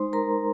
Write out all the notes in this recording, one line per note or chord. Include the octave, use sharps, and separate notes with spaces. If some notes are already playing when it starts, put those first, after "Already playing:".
Already playing: G#3 D#4 C5 C6
G#3 A#4 A#5